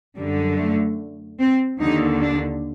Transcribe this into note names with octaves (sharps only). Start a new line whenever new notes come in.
F#2 D3 G3
A3
C4
D#2 D3 D#4
D4